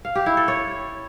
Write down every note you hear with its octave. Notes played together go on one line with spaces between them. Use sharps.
F5
G4
E4
A4
C#5